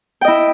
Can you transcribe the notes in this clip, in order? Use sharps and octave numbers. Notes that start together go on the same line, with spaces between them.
E4 D#5 G5